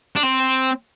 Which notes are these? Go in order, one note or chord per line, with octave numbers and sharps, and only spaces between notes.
D4
C4